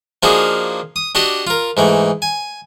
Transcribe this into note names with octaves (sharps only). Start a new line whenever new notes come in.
F3 A#3 D4 D#4 F#4 G#4
D#6
D4 F#4 G4 D#5 A5
F4 A#4
G#2 E3 A3
G#5